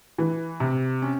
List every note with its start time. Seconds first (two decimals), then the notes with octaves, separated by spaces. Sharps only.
0.18 E3
0.60 C3
1.02 C#4